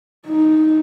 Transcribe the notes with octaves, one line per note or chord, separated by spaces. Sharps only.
D#4